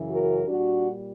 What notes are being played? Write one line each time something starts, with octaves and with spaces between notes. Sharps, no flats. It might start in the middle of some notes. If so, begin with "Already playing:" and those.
Already playing: F#2 C#3 E3
F#4 A#4
A#2 G3 D4 F#4